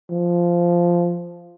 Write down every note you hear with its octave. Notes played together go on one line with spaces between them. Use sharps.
F3